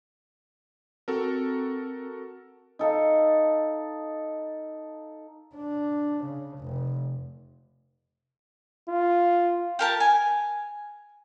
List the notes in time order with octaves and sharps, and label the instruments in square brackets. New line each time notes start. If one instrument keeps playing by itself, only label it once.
[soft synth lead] C4 [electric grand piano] F#4 A4 A#4
[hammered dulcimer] D#4 A4 F5
[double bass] D4
C#3
F1
[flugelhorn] F4
[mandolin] G4 A#4 A5
G#5